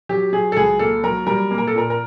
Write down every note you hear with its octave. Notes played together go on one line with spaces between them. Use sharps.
F#3 G4
F#3 G#4
A4
C#2 G#4
A#3 A4
F#3 A#4
G3 A#4
A#3
A#4
A4
A#2 A#4
A#4